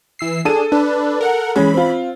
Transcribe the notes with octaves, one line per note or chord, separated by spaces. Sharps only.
E3 E6 C7
D4 G#4 A4 D#7
D4 B4
A#4 F#5
E3 G#3 C#4 B5
C4 F4